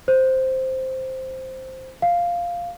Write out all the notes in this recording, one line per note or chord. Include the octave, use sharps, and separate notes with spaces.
C5
F5